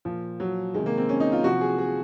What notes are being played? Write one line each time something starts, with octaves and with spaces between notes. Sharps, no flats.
A#2 F3
F#3
C3 D#3 G#3
A#3
C4
C#4
D#4
F4
C3 F3 F#4
G#4
G#4